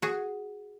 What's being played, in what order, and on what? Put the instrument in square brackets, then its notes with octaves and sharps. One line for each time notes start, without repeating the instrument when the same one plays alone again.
[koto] F#4 G#4